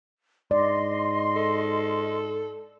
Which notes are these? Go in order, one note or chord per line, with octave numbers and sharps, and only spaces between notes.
G#2 D5 D#5 C6
A4